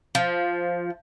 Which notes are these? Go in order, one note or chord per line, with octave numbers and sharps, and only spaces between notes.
F3